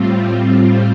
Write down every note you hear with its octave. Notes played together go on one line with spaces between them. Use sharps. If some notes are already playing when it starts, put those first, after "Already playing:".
Already playing: A2 G3 C4 F4